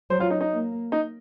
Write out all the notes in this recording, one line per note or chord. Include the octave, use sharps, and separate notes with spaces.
F#3 C5
F4
D#4
D#4
A#3
D#4